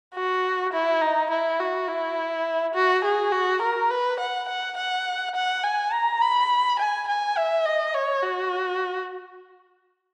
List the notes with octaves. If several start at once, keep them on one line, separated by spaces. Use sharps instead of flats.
F#4
E4
D#4
E4
F#4
E4
F#4
G#4
F#4
A#4
B4
F#5
F#5
F#5
F#5
G#5
A#5
B5
G#5
G#5
E5
D#5
C#5
F#4